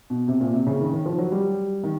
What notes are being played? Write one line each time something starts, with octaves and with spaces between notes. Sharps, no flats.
B2
C3
A#2
C3
C#3
D#3
D#3
F3
F#3
G3
D#3